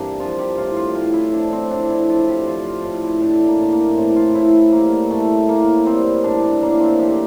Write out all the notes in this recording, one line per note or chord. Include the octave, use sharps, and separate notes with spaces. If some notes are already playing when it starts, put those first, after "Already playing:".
Already playing: G2 E3 A#3 C4 D4
F3 F4
G4
A2 F4
F4
A2 F4
E4
F3 D4
C4
A2 D4
E4
F3 F4
G4
F3 F4
F4
A2
E4
A2 D4
A#3
A2
A#3
A2 C4
F4
A2 E4
C4
G3 A#3
A2 A3
A2 A#3
G3 C4
A2 D4
D4
A2 A#3
C4
F3 G4